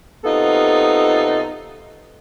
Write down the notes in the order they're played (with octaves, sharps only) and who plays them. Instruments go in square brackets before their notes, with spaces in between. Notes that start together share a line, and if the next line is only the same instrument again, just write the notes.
[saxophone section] C3 B3 D#4 F4 A4